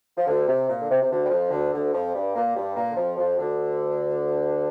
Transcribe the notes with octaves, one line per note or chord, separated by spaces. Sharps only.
F3
D2 D3
C3
A#2
D3
C3
C3
D2 D3
G3
F2 F3
D2 D3
D2 D3
F2 F3
G2 G3
A#2 A#3
G2 G3
A#2 A#3
D3
F2 F3
F2 F3
D2 D3